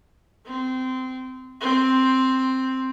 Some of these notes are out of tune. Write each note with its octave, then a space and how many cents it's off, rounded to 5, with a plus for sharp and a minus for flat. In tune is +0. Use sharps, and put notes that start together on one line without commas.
C4 -20
C4 +0